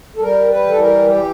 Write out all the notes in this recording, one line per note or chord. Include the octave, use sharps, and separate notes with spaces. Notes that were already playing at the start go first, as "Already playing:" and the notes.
A4
G3 A#4
B4
E3 A4
A#4
G4